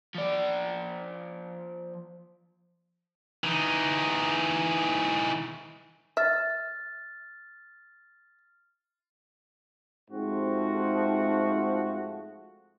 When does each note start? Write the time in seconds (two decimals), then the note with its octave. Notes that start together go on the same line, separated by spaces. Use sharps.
0.15 F3 D5
3.44 E3 D#4
6.17 E5 F6 A6
10.11 G#2 F3 A3 C4 F#4